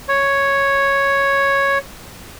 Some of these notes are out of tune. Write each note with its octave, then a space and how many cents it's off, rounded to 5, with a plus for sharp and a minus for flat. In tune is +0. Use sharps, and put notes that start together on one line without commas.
C#5 +0